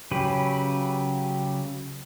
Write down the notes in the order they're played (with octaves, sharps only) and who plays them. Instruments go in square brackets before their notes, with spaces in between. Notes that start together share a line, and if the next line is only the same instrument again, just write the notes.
[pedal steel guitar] C#3 F#3 G4 B4